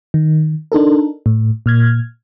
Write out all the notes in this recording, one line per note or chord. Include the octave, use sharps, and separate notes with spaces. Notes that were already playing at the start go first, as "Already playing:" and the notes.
D#3
D4 D#4 A4 A#4
A2
A#2 F6 G#6